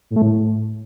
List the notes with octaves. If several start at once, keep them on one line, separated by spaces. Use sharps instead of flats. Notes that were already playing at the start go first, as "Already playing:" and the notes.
A2
A3
A2